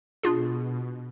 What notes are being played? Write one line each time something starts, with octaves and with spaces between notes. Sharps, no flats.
B2 D4 F4 G#4